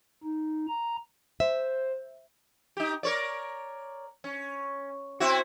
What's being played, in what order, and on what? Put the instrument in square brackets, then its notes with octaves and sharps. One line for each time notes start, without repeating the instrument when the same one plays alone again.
[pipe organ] D#4
A#5
[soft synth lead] C5 [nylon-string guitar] E5
[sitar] D#4 G4
A#4 C#5 D5
C#4
C4 E4 F#4